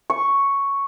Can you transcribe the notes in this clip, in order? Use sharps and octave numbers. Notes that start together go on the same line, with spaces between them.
C#6